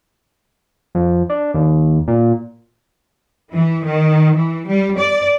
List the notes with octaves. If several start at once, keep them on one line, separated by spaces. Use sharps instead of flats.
F2
D4
D#2
A#2
E3
D#3
E3
G3
D5